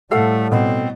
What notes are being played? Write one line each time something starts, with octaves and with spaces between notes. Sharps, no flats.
A2 G3 A3 A4 F5 F#5
B2 C4